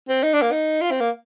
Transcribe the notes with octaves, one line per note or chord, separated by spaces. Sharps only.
C4
D#4
D4
A#3
D#4
F4
C4
A#3